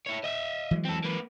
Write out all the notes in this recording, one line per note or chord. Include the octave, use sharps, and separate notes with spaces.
E4 C#5
D#5 E5
E3 F#3 G#3
C4 A4
A#3 B4